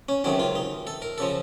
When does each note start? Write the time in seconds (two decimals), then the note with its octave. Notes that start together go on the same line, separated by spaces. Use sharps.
0.09 C#4
0.24 C#2 C3 D#3 F#3 C#4
0.40 F4
0.55 D#4
0.87 A4
1.02 A#4
1.18 C#3 F3 A4